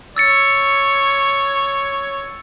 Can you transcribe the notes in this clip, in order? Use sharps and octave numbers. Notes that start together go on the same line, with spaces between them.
C#5 E6 A6 C#7